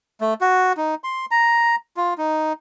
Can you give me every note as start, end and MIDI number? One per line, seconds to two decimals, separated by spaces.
0.21 0.34 57
0.41 0.73 66
0.77 0.95 63
1.04 1.26 84
1.31 1.76 82
1.97 2.14 65
2.18 2.53 63